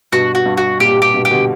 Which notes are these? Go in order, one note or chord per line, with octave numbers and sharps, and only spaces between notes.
G2 B2 F#4
F#4
G2
F#4
A#2 G4
A#2 G4
G2 B2
G4
B2 D3